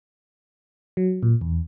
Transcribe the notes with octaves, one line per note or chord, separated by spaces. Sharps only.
F#3
A#2
E2